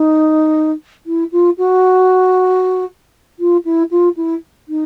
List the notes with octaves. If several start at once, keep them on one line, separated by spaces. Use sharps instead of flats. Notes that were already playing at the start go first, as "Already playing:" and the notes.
Already playing: D#4
E4
F4
F#4
F4
E4
F4
E4
D#4